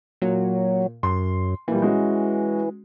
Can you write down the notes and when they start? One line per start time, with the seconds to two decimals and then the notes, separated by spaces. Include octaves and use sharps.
0.22 A#2 F#3
1.03 F#2 C6
1.68 A#2 E3 G3
1.82 G#3 C#4 F#4